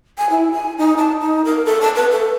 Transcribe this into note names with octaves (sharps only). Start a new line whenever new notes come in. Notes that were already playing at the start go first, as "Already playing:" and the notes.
G#5
E4
G#5
D#4
A5
D#4
A#4
A4
A5
B4
A4